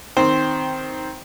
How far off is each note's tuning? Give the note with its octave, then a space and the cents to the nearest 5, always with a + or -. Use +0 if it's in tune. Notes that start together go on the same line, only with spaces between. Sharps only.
D#3 +5 C4 +0 C5 +0